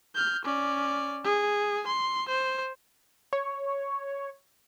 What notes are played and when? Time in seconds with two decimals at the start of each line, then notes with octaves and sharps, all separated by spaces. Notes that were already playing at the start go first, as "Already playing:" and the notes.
0.15 F6 G6
0.45 C#4 D5
1.24 G#4
1.87 C6
2.28 C5
3.33 C#5